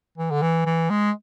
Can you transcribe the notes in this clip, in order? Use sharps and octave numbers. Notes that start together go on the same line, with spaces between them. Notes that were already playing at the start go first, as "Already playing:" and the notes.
E3
D3
E3
E3
G#3